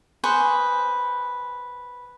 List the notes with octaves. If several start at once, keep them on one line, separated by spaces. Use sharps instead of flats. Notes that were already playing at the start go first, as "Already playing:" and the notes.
G#4 B4 C5 C#6